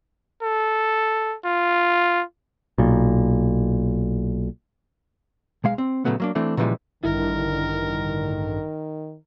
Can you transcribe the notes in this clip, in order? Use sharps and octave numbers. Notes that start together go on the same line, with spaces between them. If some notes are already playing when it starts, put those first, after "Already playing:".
A4
F4
B1 A#2
B1 G#3 F5
C4
A#2 C#3 F#3 A3 B3
F#3 A#3 D4
E3 A3 C4 D4
A#2 C#3 E3 F3 G3 G#3
A1 G2 D3 D#3 E4 A#4